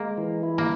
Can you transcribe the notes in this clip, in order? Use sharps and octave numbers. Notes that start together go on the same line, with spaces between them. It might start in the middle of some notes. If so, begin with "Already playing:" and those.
Already playing: G#3 A#3
E3
E4
A#3